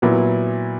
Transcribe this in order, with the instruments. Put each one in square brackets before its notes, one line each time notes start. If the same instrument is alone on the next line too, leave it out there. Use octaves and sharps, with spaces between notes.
[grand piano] A#2 F#3 B3 E4